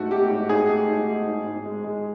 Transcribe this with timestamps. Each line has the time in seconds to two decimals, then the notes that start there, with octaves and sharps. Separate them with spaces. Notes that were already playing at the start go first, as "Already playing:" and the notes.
Already playing: G#2 A3 F#4
0.11 A3 G4
0.30 G#2
0.49 G#2 G#4
0.70 A3
0.88 G#2
1.07 A3
1.27 G#2
1.46 G#2
1.66 G#3
1.84 G#3